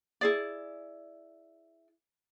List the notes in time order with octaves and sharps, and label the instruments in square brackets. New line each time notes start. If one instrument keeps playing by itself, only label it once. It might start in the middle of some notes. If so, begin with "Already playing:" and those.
[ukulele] E4 G#4 D5